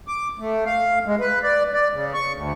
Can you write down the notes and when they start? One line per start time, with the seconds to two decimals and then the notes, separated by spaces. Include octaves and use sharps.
0.08 D6
0.39 A3
0.66 F5
1.06 G#3
1.20 B4
1.43 D5
1.73 D5
1.93 C#3
2.14 C#6
2.34 D2